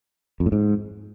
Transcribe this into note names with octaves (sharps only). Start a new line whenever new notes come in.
F2
A2
G#2